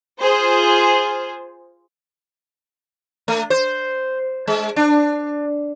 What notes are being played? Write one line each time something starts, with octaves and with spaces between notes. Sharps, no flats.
F4 G#4 C5
A3
C5
G#3
D4